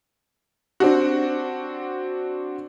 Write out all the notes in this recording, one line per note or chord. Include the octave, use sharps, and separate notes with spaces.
C4 D4 F#4